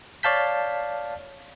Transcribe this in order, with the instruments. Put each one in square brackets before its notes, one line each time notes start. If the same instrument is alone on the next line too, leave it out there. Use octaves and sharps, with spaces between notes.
[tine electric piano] C#5 D5 F5 A5 G6 B6